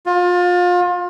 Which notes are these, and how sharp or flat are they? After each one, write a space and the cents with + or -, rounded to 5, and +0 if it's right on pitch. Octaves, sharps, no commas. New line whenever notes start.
F4 +30